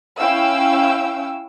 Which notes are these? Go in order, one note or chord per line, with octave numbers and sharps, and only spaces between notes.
C#4 E4 F5 G5 E6